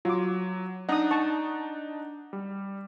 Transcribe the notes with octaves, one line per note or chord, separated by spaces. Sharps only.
F#3 F4 D6
D4 D#4 D#5 F#5 D#6
A5 C#6
G3